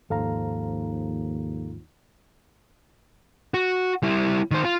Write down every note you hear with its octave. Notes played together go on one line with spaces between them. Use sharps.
D#2 G#2 F3 A4 F5 A#5
F#4
G3 E4
D#3 C5
F4